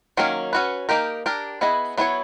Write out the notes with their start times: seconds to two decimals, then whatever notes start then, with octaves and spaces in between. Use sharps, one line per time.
0.17 D#3 F#3 A#3 C#4
0.53 C#4 F#4 B4
0.89 A#3 D#4 G4 A#4
1.26 D4 G4 A#4
1.61 B3 E4 G#4 B4 D#5
1.97 F#3 B3 E4 G#4 C#5